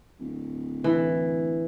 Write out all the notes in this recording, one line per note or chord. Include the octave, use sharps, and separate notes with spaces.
D1
E3